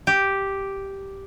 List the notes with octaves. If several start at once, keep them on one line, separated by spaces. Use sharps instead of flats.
G4